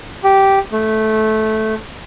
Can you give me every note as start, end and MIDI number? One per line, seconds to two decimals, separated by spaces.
0.24 0.59 67
0.72 1.74 57